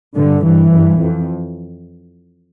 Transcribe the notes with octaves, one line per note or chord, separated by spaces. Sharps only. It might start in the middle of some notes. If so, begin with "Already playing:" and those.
G2 D3
G2 E3
G2
F2